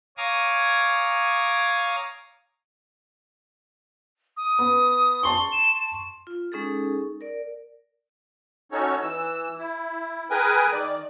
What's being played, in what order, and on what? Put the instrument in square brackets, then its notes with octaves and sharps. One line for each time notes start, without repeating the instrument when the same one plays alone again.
[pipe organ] C#5 F5 G#5 A#5 D6 D#6
[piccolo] D#6
[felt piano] B3
[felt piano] A5 C6 C#6 [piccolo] G7
[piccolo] E7
[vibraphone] F4
G#3 C#4 D#4 G#4 A4
A#4 D5
[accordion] C#4 D#4 F#4 A4 C#5
E3 E6
E4
G#4 A#4 B4 G5 G#5 D#6
D#3 D5